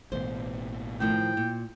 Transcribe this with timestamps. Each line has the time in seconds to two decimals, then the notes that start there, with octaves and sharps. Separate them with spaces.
0.12 A1 B2 E3 C5
1.00 A2 D#3 F3 G5
1.37 A#2